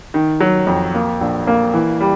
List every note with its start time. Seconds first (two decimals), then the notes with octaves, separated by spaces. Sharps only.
0.14 D#3
0.40 F#3
0.67 F2
0.94 A#3
1.21 A#1
1.47 A#3
1.74 E3
2.01 G3